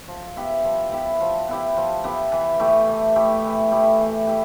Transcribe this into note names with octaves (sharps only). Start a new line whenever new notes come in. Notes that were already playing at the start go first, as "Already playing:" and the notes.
F3
B3 E4 G4
F3
B3 E4 G4
F3
B3 E4 G4
F3
B3 E4 G4
E3
A3 E4 G4
E3
A3 E4 G4
E3
A3 E4 G4
E3
E4 G4